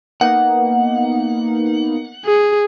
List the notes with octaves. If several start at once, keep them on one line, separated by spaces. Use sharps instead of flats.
A#3 B3 D#4 F#5
G#4